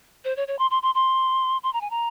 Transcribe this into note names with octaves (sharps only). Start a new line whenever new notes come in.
C5
C#5
C#5
C6
C6
C6
C6
C6
A#5
G#5
A#5